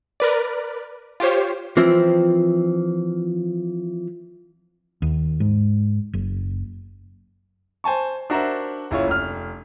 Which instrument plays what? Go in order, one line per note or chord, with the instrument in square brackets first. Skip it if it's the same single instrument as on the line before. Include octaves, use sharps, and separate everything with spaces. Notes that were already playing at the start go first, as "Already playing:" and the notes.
[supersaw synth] A#4 B4 D5
F4 G4 C5 C#5
[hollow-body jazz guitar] E3 F3 C4
[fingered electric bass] D#2
G#2
F#1
[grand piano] C5 G#5 A5 C#6
D4 F#4 A#4 C5 E5
F#1 E4 F4 C#5
F1 F6